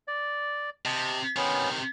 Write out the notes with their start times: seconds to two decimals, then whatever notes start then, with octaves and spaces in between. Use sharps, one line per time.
0.08 D5
0.85 C3 D#5 A5
1.36 C3 D#3 B3 C#4